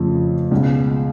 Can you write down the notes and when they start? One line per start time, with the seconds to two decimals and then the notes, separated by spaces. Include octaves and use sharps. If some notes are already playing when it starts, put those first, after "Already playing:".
Already playing: F2 C#3 F3 A3
0.51 C#2 B2 G#3